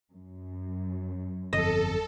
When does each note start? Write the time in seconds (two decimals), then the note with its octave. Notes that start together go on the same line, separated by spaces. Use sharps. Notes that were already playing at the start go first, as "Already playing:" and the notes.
0.13 F#2
1.53 G1 F2 A4 D#5